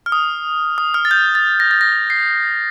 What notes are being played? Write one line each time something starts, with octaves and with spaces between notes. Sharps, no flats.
F6
D#6
D#6
F6
A6
G6
A6
A#6
A6
A#6
C7